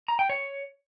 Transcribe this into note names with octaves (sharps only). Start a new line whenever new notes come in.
A#5
G5
C#5